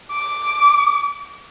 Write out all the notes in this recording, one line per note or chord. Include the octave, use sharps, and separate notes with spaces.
D6